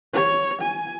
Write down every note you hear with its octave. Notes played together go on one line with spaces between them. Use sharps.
C#5
G#5